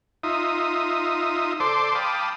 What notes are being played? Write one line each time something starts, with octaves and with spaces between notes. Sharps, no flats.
D#4 F4 E5 D#6
A4 C5 D5 C6 D6
F5 G5 A5 B5 D6 D#6